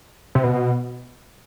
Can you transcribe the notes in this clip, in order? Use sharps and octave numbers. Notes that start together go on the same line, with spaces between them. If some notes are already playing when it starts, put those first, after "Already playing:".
C3
B2